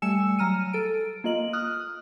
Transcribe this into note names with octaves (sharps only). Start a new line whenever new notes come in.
G3 A3 G#5 E6 C#7 E7
F#3 A#5 F6 D#7
A4 D7
A#3 F4 D#5 F#7
D#6 F6 F#6